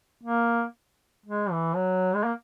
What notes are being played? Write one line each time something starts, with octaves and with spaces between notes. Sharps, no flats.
A#3
G#3
E3
F#3
G#3
A#3